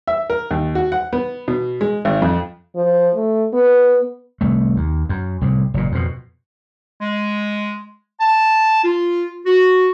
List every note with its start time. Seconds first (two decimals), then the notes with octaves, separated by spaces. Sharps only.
0.07 E5
0.30 A#4
0.51 D#2
0.75 F#4
0.92 F#5
1.13 B3
1.48 B2
1.81 G#3
2.05 G#1
2.22 F2
2.75 F3
3.15 A3
3.53 B3
4.41 C2 A3
4.76 D#2
5.09 F#2
5.41 C2 A2
5.74 F#1 A#2
5.92 F2 B2
7.01 G#3
8.21 A5
8.84 F4
9.46 F#4